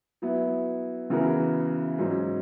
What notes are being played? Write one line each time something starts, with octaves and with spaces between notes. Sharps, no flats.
F#3 B3 E4
C#3 E3 B3 F#4 A#4
G#2 F#3 C#4